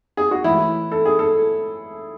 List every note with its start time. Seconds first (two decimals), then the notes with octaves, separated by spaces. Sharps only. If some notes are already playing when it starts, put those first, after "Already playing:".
0.17 G#4
0.31 F#4
0.44 A2 E3 E4
0.92 A4
1.06 G#4
1.19 A4